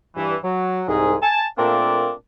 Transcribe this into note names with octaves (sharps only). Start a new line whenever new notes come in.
G2 E3
F#3
C2 G#2 G#4
G#5 A5
A#2 A3 A#3 C4 D4